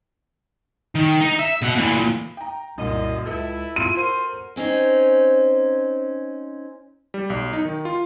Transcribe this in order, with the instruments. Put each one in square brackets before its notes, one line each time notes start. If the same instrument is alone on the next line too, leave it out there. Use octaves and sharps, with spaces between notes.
[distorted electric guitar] D#3
D#4
E5
B2 F#5
A#2 E3
[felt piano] G5 A#5
[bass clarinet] C2 [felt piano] F#2 A#2 F#3 [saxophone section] D#5
[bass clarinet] C#2 [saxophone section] E4 [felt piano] A4 B4
[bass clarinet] F4 [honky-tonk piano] D#7
[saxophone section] F#4 A#4 [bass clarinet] C5
[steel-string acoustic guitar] C4 C#4 D#4 C5
[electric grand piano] G3
B1
D#4
D#3
F4